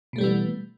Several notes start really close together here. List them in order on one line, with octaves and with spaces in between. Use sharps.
B2 A3 G3 B3 E3